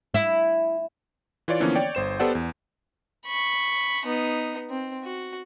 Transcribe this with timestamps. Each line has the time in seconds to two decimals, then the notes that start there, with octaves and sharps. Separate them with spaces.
0.14 E4
1.48 E3 F4 C#5 D5
1.60 D3 E3 F3 A#3 B3 C#4
1.75 C#5 D5 G5
1.95 G1 C5 E7
2.20 B3 G4 A4 C5 D5 F#5
2.35 E2
3.26 B5 C#6
4.06 B3 D#4
4.70 C4
5.04 F#4